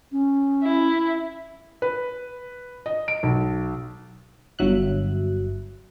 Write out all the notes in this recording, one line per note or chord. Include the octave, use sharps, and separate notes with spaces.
C#4
E4
B4
D#5
D7
B1
G1 F#3 E5 F#6